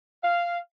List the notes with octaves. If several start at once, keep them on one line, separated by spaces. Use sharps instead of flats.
F5